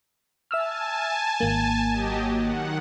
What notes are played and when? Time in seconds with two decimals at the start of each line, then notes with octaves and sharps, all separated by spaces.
0.51 E5 G#5 A5 E6 F6
1.40 G#1 A#3
1.92 F#3 G4 D#5
2.33 D#3 F#5